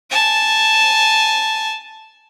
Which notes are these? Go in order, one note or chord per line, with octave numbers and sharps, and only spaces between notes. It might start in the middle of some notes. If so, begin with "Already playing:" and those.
G#5 A5